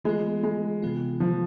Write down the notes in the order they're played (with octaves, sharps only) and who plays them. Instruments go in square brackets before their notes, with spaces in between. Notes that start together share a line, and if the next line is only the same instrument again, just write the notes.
[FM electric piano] E3 B3 F4 [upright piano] G#3
[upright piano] G#3
[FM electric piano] C3 E3 B3 F4
[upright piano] F3